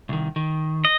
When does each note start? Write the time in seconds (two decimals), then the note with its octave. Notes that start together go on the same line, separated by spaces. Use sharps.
0.09 C2 D#3
0.36 D#3
0.85 D#5